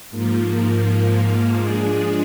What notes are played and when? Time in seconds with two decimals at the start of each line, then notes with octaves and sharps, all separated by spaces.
0.11 G#2 F3 A#3
1.55 F3 G#3 D4 G#4